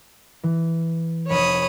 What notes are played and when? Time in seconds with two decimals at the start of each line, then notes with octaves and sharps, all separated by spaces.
0.43 E3
1.29 F1 C#5 B5 D#6 C#7 E7